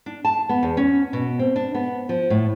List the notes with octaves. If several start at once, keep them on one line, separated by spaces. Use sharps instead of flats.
D4
A5
B3
E2
C#4
B2
C4
D4
B3
F3
A2